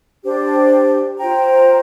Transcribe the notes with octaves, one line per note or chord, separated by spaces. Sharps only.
D4 G4 C5
F4 C5 G5 A#5